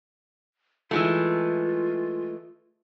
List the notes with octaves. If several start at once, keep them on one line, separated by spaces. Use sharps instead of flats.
E3 G#3 A3 F4